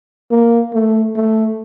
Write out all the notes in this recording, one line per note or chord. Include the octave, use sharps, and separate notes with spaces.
A#3
A3
A3